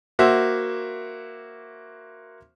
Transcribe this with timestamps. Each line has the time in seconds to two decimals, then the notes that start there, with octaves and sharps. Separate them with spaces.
0.19 A#3 F#4 C5 E5